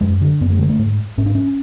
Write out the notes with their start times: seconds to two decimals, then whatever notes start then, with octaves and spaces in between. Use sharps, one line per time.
0.01 F#2 G#3
0.21 D3
0.41 F#2 B3
0.50 A3
0.59 D3 G#3
0.69 A3
0.79 G#2
1.18 G#2 C#4
1.26 D4
1.35 C#4